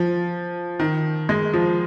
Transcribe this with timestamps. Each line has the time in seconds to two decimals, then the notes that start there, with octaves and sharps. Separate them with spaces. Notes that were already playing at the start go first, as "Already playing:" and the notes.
Already playing: F3
0.79 D#3
1.29 G#3
1.54 F3